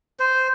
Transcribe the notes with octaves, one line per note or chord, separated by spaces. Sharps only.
C5